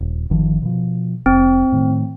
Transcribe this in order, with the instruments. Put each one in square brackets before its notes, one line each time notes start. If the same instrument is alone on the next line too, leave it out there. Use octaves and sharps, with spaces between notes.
[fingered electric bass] D#1
G1 D#3 F3
B2 F3
[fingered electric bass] F1 [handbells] C4
[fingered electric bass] A2 D#3